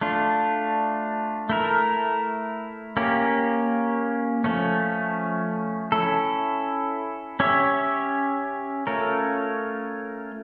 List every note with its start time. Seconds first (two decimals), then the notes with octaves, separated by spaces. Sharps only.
0.01 A3 D4 F4
1.50 A3 E4 A#4
2.97 A#3 C#4 G4
4.44 F3 A3 C#4
5.92 C#4 E4 A4
7.40 C#4 G4 C#5 E5
8.87 A3 C#4 F4 A#4 C#5